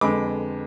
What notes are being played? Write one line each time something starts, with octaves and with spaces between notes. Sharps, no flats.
F2 D3 G#3 B3 B5 D6